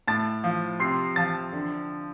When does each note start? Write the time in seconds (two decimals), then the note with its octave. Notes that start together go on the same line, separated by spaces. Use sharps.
0.07 A2 A5 A6
0.44 F3
0.80 C3 C6 C7
1.16 F3 A5 A6
1.53 D3